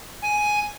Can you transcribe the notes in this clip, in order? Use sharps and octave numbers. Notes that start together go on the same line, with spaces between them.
G#5